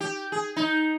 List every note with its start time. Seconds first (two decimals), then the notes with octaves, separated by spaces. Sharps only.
0.01 G4
0.32 G#4
0.56 D#4